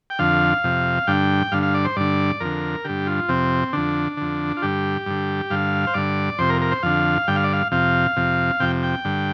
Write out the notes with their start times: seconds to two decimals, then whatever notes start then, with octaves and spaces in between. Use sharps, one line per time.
0.10 G5
0.19 F2 D3 F5
0.64 F2 C3
1.07 G2 D3 G5
1.52 G2 D3 F5
1.63 F5
1.74 D5
1.85 C5
1.96 G2 D3 D5
2.40 F2 D3 A#4
2.84 G2 D3 G4
3.07 F4
3.28 F2 C3 C4
3.73 F2 D3 D4
4.17 F2 D3
4.57 F4
4.62 G2 D3 G4
5.06 G2 D3
5.50 G2 D3 F5
5.87 C5
5.94 G2 D3 D5
6.38 F2 C3 C5
6.50 A#4
6.61 A#4
6.71 C5
6.83 F2 D3 F5
7.27 G2 D3 G5
7.36 F5
7.44 D5
7.53 F5
7.71 F2 C3 F5
8.16 F2 C3
8.60 F2 C3 G5
8.83 G5
9.05 G2 D3